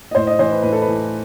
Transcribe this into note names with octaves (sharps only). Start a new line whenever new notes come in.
D#5
A2 C5
D#5
E3 C5
B4
A2 B4
A4
B4
E3